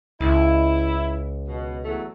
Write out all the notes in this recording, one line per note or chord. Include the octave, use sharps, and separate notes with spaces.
C#2 E4
B2
E2 F#3 A3